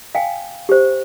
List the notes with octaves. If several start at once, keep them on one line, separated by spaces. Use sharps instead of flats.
F5 G5 G#5
G4 C5